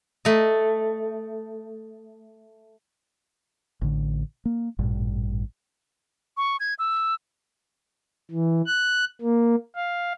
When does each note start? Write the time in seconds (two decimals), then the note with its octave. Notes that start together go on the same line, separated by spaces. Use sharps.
0.25 A3 D#5
3.82 A1 D3
4.45 A#3
4.79 A1 G2 A#2
6.37 C#6
6.60 G#6
6.79 E6
8.31 E3
8.66 F#6
9.22 A#3
9.76 F5